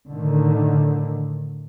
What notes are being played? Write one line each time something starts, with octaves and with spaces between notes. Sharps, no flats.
A2 D3 D#3